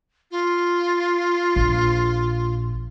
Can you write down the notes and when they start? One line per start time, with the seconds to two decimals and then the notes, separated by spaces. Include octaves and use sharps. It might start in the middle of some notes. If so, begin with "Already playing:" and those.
0.31 F4
1.56 A#1